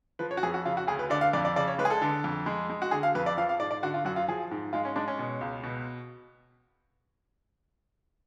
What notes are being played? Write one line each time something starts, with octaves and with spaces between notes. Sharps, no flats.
F3 B4
C#5
F#4
F2 G#4
F#4
C#3 F4
F#4
D2 G#4
B4
D3 D5
F5
F2 D5
D5
C#3 D5
C#5
G#3 B4
G#4
A4
D3
F2
G#3
G#3
F#4
D3 G#4
F5
F2 B4
D5
F3 F5
F5
G#2 D5
D5
D3 F#4
F4
F#2 F#4
F4
F3 G#4
G#2
G#3 F4
C#4
G#3 D4
C#4
B2
C#2
B2